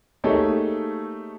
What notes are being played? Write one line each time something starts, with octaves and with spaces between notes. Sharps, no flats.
A3 A#3 D#4 G4 G#4 C#5